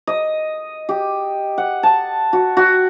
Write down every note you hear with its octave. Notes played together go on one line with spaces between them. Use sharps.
D#5
G4
F#5
A5
F#4
F#4